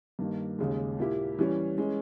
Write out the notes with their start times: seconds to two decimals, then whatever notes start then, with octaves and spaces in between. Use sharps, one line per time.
0.19 G2 D#3 A#3
0.59 D#2 C#3 G#3
0.99 A#2 A#3 E4 G4
1.39 E3 G3 C#4
1.78 E3 G#3 C#4